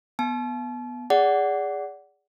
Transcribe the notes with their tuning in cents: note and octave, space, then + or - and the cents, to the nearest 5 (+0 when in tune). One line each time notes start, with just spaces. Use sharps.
B3 -5 A5 -35
G#4 -15 D5 -20 F#5 +10